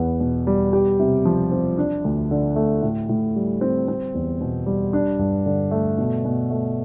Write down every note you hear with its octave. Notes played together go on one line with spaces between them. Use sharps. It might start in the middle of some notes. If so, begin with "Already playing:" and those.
Already playing: E2 B3
B2
G3
G4
C3
F3
C4
D4
D2
D3
A3
A2
A2
G3
C4
C4
E2
B2
G3
D4
G2
D3
A3
B2
B2
A3